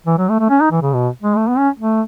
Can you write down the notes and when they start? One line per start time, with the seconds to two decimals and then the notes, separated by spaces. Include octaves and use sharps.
0.06 E3
0.18 F#3
0.29 A3
0.40 A3
0.50 C#4
0.60 D#4
0.71 E3
0.82 C#3
0.93 B2
1.22 G#3
1.36 A3
1.48 B3
1.58 C#4
1.79 A3